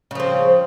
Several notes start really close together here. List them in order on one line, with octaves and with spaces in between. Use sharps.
C#3 F3 C4